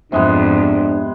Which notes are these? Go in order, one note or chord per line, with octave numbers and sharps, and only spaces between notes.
F2 G#2 C3 G#3 B3 D4